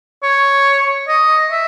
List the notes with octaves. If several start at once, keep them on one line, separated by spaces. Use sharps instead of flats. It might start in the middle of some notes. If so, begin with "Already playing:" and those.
C#5
D#5
E5